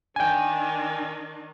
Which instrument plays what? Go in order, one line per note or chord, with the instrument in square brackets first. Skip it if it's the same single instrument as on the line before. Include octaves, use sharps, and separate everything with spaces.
[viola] D#3 D4 [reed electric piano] G5 G#5